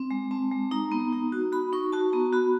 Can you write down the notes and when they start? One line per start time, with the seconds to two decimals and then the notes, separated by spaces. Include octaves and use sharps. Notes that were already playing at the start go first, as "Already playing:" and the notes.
Already playing: C4
0.11 G#3
0.31 C4 A5
0.52 G#3
0.71 D#4 A#5
0.92 B3
1.12 D#4
1.32 F#4
1.52 F#4 B5
1.73 D#4 C#6
1.92 F#4 A5
2.13 B3 A#5
2.33 F#4 B5